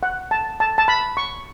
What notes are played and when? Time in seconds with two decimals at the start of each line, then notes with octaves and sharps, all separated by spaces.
0.03 F#5
0.31 A5
0.60 A5
0.78 A5
0.88 B5
1.17 C#6